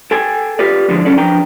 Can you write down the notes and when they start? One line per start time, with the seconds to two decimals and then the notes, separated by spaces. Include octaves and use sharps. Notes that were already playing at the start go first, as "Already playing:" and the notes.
0.11 A4 G5 G#5
0.59 F4 G4 B4 D5
0.88 G#2 D3 E3 F3 G#3 D4
1.05 C#3 F#3 C#4 A4 D5
1.18 F3 D4 B4 G5 A#5